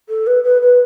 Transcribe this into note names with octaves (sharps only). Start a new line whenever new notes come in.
A4
B4
B4
B4